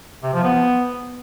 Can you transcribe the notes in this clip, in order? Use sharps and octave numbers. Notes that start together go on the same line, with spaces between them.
C3
F3
B3